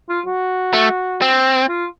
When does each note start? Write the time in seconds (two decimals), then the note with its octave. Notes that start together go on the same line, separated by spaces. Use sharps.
0.09 F4
0.26 F#4
0.73 A3
1.22 C4
1.69 F4